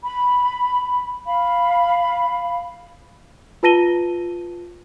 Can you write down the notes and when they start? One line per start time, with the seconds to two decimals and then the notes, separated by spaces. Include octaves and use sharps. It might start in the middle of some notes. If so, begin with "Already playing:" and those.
0.04 B5
1.25 F5 B5
3.63 F4 B4 A5 A#6 D#7 G7